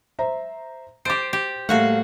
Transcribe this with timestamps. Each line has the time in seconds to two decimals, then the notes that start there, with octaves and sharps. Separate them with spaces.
0.19 C5 E5 A#5
1.05 G4 C5 D6 A6 D7
1.33 G4
1.69 A2 G3 A3 A#3 F#4 F5 F#5